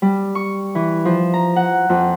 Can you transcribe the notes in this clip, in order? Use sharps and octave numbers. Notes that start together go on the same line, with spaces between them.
G3
C#6
E3
F3
A#5
F#5
F2